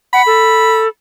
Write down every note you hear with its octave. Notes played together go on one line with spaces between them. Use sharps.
F#5 B5
A4